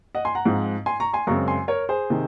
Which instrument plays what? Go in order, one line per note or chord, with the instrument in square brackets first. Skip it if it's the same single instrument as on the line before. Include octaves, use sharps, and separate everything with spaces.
[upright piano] D#5 F#5
G#5 C6
F#5 A#5
G#2 F3 G#3 C4
G#5 C6
A#5 C#6
G#5 C6
F#2 C#3 G#3 C4 A#5 C#6
G#5 C6
A#4 C#5
G#4 C5
C3 D#3